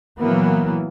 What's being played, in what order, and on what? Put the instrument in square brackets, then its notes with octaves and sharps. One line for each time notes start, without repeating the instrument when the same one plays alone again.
[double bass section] A#2 E3 F#3 A#3 B3